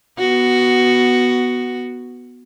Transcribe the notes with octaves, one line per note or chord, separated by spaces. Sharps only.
B3 F#4